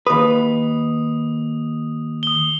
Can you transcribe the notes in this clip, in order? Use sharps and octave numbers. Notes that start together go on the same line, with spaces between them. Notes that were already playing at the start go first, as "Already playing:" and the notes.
D#2 B4 D#6
D#6 G7